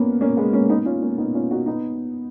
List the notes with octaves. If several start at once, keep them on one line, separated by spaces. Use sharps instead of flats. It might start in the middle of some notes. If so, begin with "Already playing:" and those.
Already playing: A#3 B3 C#4
A#3 C#4
G#3 B3
A#3 C#4
B3 D#4
C#4 F4
A#3 C#4
B3 D#4
C#4 F4
D#4 F#4
B3 D#4